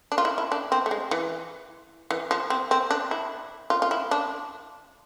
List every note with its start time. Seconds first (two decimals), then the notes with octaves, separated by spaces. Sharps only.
0.12 D4
0.18 F4
0.25 E4
0.38 E4
0.52 D4
0.72 C4
0.86 A3
0.91 G#3
1.11 E3
2.11 E3
2.31 F3
2.50 C4
2.71 C4
2.91 D4
3.11 E4
3.70 F4
3.82 F4
3.91 E4
4.11 D4